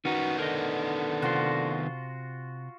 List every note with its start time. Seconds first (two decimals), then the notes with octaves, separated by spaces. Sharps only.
0.05 D#3 B3 C#4 D#4 F#4
0.39 D3 A#4 D#5
1.22 C3 F4 F#4 C5